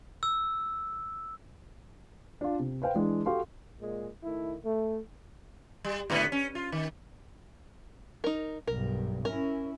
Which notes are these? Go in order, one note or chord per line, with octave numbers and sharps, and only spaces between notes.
E6
D4 F4
C3
B4 C5 F5 G5
E3 G#3 D4
F#4 G4 A4 F5 C6
A#2 G#3
D#3 A3 E4
A3
G3
G#2 D3 B3
C#4
F4
D#3
D#4 A#4
B1 G2 A#4
C#4 E4 A#4